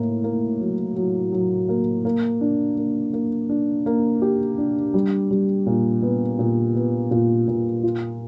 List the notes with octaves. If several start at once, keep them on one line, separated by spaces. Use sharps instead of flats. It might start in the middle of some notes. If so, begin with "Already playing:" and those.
Already playing: A2 A#3
A#3
F#3
F#3
F#3
A#3
A#3
D4
A#3
A#3
D4
A#3
G4
D4
G3
G3
A#2
B3
A#2
B3
A#2
A#2
F4